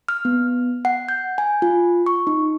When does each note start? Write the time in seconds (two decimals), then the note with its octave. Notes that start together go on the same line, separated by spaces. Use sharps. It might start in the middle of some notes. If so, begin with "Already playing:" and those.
0.09 F6
0.25 B3
0.85 F#5
1.09 G6
1.38 G#5
1.62 F4
2.06 C#6
2.27 D#4